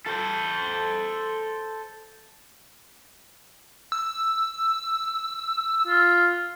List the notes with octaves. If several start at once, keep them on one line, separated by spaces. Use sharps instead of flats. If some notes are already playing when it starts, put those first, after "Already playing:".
A4 C5
E6
F4